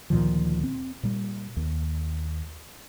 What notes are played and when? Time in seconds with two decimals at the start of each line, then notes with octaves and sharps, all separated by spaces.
0.10 D2 A#2 D#3 F3
0.63 C4
1.03 A#2 G3
1.57 D#2